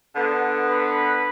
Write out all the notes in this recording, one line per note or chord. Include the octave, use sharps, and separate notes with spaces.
D3 B3
B4